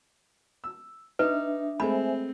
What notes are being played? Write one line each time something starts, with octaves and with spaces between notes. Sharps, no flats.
E6
D4 D#4 B4 E5
G#3 A3 C4 C5 E5 G#5 B5